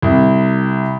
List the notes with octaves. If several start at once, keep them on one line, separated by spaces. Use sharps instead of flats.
C2